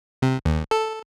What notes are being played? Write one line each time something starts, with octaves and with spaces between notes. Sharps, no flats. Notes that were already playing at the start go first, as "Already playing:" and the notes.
C3
D#2
A4